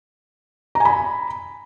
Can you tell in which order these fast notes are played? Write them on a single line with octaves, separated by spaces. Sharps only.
A#5 G#5 B5